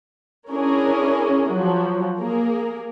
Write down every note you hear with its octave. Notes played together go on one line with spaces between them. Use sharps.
C#4 D4 E4 G#4 A#4 C#5
F3 F#3
A#3 G#4 A#4